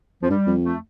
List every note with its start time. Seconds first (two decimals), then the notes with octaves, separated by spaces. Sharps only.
0.22 F2 F3
0.29 G2 G3
0.46 F2
0.64 A3